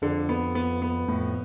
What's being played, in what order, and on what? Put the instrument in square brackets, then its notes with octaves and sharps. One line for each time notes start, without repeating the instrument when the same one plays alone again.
[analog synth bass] F2 [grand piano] D3
[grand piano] B3
B3
B3
[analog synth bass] F2 [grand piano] A2